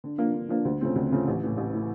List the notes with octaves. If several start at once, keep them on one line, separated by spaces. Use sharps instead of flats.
D3
F3 A#3 D4
D3
F3 A#3 D4
D2
C#3 F3 A3 C4
D2
C#3 F3 A3 C4
A1
A2 E3
A1
A2 E3